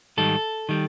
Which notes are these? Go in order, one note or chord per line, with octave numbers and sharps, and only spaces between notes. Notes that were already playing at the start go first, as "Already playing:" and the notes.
G#2 D#3 G3 A4
D#3 G3